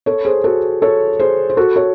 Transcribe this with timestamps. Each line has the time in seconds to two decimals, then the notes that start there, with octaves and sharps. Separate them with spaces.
0.06 A4 C#5
0.25 G#4 C5
0.44 F#4 A4
0.82 A4 C#5
1.19 G#4 C5
1.50 C5
1.57 F#4 A4
1.76 A4 C#5